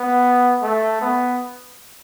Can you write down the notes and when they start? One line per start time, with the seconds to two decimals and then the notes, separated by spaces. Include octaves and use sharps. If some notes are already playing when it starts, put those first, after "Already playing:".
Already playing: B3
0.62 A3
1.01 B3